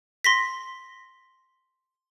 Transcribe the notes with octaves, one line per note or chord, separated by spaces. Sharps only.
C6 A#6 B6